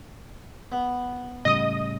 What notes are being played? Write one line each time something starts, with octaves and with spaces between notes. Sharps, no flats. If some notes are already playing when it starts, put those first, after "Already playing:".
B3
A2 C#3 G3 D#5 D#6